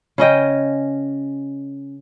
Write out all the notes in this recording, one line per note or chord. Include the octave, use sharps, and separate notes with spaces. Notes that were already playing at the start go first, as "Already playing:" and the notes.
C#3 C#4 D#5 G5